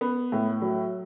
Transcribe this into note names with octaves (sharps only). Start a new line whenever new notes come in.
B3
A2
F#3